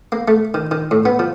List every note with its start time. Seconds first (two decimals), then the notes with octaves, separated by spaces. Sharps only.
0.12 A#3
0.28 A3
0.54 D#3
0.71 D#3
0.91 A2
1.05 B3
1.19 F3